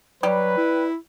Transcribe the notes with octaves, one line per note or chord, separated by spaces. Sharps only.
F#3 G3 B4
E4